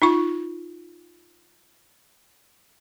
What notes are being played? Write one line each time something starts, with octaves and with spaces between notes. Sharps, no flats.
D#4 F4 C#6